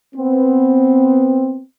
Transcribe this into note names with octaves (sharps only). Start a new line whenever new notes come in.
B3 C4